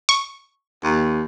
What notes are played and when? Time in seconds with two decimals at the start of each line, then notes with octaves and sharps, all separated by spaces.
0.09 C#6
0.83 D#2